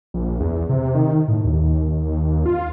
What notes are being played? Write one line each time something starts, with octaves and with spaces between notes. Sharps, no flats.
A#1
E2
C3
D#3
A2
D#2
F4